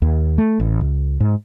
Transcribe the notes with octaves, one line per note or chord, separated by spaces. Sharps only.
D#2
A3
A1
C#2
G#2